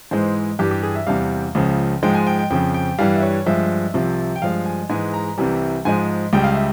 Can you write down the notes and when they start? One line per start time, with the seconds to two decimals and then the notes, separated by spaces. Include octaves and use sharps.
0.11 G#2 E3 G#3 C5
0.59 G2 E3 G3 G4
0.71 G4
0.83 G#4
0.95 E5
1.06 E2 C3 G3 F5
1.55 C#2 C#3 F3
2.03 G#2 F3 G#3 G5
2.14 G#5
2.27 G5
2.39 G5
2.50 F2 C#3 F3 G5
2.74 G5
2.98 G2 E3 G3 F5
3.16 E5
3.22 C#5
3.46 G2 F3 G#3 E5
3.94 C2 C3 F3
4.36 G5
4.42 G2 F3 G#3 F5
4.66 G#5
4.90 G#2 E3 G#3 G#5
5.14 A#5
5.37 C2 C3 E3 G3
5.85 G#2 F3 G#3 G#5
6.33 C#2 C#3 G3 G5
6.44 F5
6.54 E5